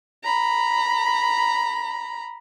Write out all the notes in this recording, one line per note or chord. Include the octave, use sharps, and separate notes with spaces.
A#5 B5